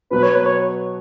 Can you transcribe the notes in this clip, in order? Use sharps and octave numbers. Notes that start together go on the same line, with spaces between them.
B2 F#3 B3 B4
C#5
B4
C#5